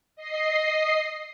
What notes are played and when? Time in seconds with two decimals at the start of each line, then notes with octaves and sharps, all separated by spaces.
0.16 D#5 C7